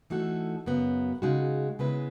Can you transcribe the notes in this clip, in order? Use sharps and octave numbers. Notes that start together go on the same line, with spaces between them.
E3 A3 D#4 F#4 A4
F#2 C#3 F#3 B3
C#3 G#3 D#4 F#4
C#3 G#3 B3 E4 B4